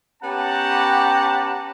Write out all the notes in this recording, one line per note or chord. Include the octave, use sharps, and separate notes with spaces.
B3 C#4 G4 F#5 A5 A#5